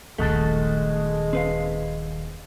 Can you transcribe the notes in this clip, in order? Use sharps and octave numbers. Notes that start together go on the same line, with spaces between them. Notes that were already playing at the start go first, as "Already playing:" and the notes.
D#1 A#1 D#3 G#3 A3 F#4 A4
C4 B4 F5